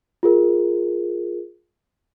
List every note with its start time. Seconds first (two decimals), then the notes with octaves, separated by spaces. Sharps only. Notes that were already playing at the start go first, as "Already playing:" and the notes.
0.23 F4 G#4 A#4